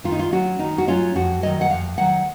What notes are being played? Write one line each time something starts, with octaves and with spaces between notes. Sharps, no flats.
D#3 F4
D#4
F4
F#3 C#4 F#4
D#3 D#4
F#4
F#3 C#4 F4
F2 F#4
D#3 F#3 D#5
F#5
F2 F5
D#3 F#3 F#5